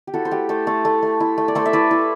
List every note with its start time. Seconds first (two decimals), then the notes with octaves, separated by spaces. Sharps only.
0.07 G4
0.14 E4 F#4 A4
0.25 C5
0.31 A3 G4 B4
0.49 A3 A4 C5
0.67 A3 A4 C5
0.85 A3
1.02 A3
1.20 E4
1.38 A3
1.48 D5
1.55 A3 A4 C5
1.66 E5
1.73 E4 B4 D5
1.91 E4